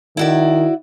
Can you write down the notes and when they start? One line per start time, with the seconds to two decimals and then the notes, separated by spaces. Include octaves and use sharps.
0.17 D#3 E4 F#4 D5